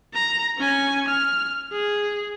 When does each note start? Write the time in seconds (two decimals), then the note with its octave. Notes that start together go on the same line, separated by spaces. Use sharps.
0.14 A#5
0.58 C#4 G#5
1.08 F6
1.72 G#4